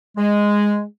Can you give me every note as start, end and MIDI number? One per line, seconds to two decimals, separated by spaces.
0.18 0.84 56